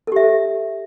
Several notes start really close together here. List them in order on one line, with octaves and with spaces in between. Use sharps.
A4 G4 E5